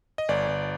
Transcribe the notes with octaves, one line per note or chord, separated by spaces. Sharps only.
D#5
G1 D5
G1